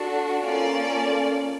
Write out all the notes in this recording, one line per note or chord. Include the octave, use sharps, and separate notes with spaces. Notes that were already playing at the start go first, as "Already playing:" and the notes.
Already playing: D4 F#4 A4
A#3 C#4 F4 A4 D5